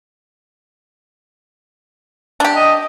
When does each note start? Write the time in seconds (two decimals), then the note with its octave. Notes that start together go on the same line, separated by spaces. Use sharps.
2.40 D4 G4
2.55 D#5